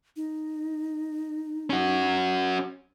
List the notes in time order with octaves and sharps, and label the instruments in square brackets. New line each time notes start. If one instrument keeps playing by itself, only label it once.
[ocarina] D#4
[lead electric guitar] C#4 F#4